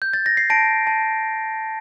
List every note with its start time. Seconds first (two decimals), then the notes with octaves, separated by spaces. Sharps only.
0.02 G6
0.13 A6
0.26 A#6
0.37 C7
0.50 A5 A#6 D7
0.87 A5